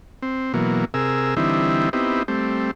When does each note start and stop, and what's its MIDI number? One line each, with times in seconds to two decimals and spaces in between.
0.22 0.53 60
0.54 0.85 47
0.54 0.85 52
0.54 0.85 54
0.54 0.85 58
0.94 1.35 48
0.94 1.35 68
0.94 1.35 70
0.94 1.35 88
1.37 1.89 50
1.37 1.89 52
1.37 1.89 55
1.37 1.89 60
1.37 1.89 63
1.37 1.89 64
1.93 2.23 59
1.93 2.23 60
1.93 2.23 63
1.93 2.23 64
1.93 2.23 67
2.28 2.71 55
2.28 2.71 57
2.28 2.71 60